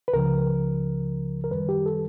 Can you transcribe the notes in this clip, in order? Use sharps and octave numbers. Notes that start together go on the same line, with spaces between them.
B4
C#2 C#3 F3 A#4
A#4
F#2 D#3 G3 B4
G4
A4